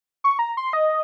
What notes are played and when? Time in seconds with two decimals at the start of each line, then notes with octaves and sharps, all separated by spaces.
0.24 C#6
0.39 A#5
0.57 C6
0.73 D#5